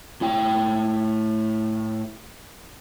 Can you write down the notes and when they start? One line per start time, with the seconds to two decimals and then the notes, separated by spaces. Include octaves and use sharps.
0.21 A2 E4 G5